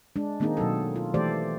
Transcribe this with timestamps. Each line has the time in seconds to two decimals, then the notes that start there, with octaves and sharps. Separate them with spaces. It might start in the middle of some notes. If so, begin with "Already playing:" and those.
0.16 G#3 D4
0.40 D#3 A#3 C4 D#4 G#4
0.57 B2 F#3 F#4 A4
0.96 F4
1.14 E3 A3 G4 A4 C5 D5